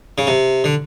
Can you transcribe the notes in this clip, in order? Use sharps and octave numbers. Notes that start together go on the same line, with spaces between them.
C#3
C3
D3